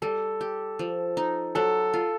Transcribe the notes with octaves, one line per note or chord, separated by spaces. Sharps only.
G3 A4
G4
F3
D#4
F#3 A4
F4